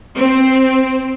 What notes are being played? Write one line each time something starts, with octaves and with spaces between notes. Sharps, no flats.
C4